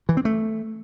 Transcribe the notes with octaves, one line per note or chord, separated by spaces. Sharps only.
E3
C4
A3